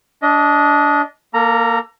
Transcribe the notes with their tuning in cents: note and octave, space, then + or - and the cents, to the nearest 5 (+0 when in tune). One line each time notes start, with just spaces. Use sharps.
D4 -20 D#5 +15
A#3 +0 A4 +40 A#5 +0